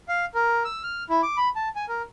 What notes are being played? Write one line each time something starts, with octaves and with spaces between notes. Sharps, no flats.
F5
A#4
E6
F6
E4
D6
B5
A5
G#5
A#4